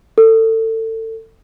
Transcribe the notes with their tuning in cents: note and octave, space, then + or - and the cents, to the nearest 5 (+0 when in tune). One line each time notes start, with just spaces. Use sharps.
A4 +25